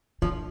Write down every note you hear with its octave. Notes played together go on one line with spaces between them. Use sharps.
D3 F3